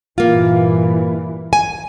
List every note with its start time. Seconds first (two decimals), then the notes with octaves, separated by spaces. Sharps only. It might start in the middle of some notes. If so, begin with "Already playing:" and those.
0.18 G2 A#2 E3 A#3 F4
1.53 G#5